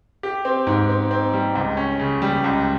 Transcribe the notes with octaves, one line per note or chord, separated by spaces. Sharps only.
G4
C4
G#2
C4
C4
G3
C#2
C#4
C#3
G3
C#2